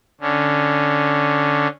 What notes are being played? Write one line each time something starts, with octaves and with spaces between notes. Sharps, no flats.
D3 C#4